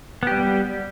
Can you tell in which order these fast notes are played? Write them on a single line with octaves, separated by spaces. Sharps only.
B3 G4 G3